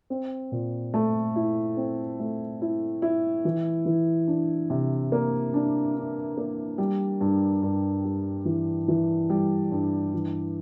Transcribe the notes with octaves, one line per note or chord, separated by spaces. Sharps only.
C4
A#2
A3
E4
C4
A3
E4
E4
E3
E3
D4
C3
A#3
D4
D4
A#3
G3
G2
G2
G3
E3
E3
G3
G2
E3